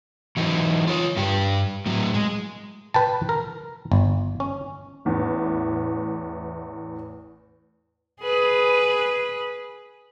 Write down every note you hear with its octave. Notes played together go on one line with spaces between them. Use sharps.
E3 F#3 D#4
F4 C#5
G2 G4
A2 F#3
G#3
B4 G5 A5
A#4
G1
C#4
A1 E2 A2
G#4 B4